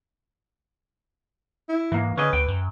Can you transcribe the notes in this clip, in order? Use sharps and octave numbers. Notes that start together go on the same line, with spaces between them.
E4
G#2 E3 A#3
D3 C#4 G#4 B4 D#5
D2 G5
F#2